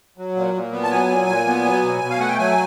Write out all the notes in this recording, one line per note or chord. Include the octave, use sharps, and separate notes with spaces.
F#3
A#2
A#2
B3
A5
F#3 G#5
A#2
A#2
B3
F#3
B2
B2
F5
A3 F#5
G5
F#3 G#5